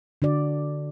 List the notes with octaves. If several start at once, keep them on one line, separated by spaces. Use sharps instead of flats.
D3 D4 F#4 D5